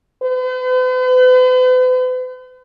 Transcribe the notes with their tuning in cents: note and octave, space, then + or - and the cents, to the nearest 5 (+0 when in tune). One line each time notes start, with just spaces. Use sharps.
B4 +45